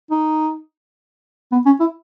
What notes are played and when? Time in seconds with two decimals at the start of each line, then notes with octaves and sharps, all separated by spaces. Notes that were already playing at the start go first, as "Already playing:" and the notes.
0.11 D#4
1.52 B3
1.66 C#4
1.80 E4